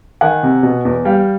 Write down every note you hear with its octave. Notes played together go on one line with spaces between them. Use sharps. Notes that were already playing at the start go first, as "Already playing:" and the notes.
D#3 F#5 G#5
C3
B2
E2
G3 F5 G5